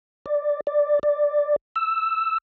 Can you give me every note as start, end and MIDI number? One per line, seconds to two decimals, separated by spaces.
0.26 0.61 74
0.67 0.99 74
1.03 1.56 74
1.76 2.38 88